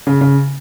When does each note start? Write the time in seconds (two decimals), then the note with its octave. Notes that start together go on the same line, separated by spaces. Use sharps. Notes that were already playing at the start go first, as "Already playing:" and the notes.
0.07 C#3
0.21 C#3